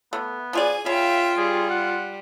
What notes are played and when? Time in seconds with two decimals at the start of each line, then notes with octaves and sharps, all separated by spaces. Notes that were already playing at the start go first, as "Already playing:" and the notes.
0.13 A3 B3
0.53 F3 F4 G#4 D5 G#5
0.86 C#3 F4 E5 F5 G5
1.37 G3 G#4
1.70 F#5